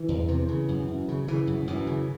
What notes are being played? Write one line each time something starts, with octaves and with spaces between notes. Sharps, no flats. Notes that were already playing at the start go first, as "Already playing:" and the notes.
Already playing: E3
E2
C3
C#3
F#2
F#2
C#3
C#3 E3
F#2
F#2 E3
C#3